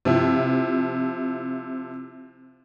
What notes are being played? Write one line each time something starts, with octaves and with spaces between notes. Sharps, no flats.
C3 F3 E4